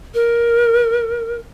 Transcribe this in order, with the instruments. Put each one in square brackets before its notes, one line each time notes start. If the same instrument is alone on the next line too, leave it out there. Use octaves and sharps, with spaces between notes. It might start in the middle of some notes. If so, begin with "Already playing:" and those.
[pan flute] A#4